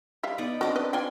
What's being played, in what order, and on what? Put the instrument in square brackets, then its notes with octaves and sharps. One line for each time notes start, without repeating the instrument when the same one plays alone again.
[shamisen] G3 E5 F5
[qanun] B3 D#4 D5
[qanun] C4 D4 A#4 [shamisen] F#4
[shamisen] B4 D#5
[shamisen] F4 D5 G5 [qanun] G#5 C6